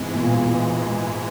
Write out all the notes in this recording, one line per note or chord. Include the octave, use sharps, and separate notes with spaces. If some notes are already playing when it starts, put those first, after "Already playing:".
Already playing: G#2 C3 E3 G#3
B2
A#2